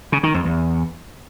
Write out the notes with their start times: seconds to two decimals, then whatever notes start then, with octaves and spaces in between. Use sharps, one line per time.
0.12 C#3
0.23 D#3
0.34 F2
0.45 E2